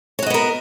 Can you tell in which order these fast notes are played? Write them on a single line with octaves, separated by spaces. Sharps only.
C#5 F#4 D#5 B3 A#4